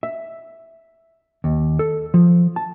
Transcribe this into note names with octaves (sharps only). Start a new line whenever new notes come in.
E5
D#2
A4
F3
A5